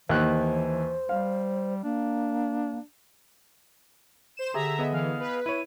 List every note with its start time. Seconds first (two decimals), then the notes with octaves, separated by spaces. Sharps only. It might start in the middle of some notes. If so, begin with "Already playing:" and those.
0.09 D#2 E3 C5 F#6
1.09 G3 F5
1.83 A#3 D4
4.37 C5 E7
4.54 D3 G4 G#4 E5 A#5
4.79 B3 G#4 D#5
4.93 E3 F5
5.20 B4
5.46 E4 C#5 D#7